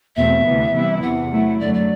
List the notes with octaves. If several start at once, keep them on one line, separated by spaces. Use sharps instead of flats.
E2 B2 A3 C4 E5
D2 C3 E3 B3
C3 E3 G3 B3 E4
E2 C3 E3 F#5
F#3 A3 E4
F#2 D3 F#3 A3 D5
D5